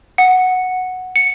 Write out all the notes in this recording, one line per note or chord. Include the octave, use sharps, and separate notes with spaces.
F#5
C#7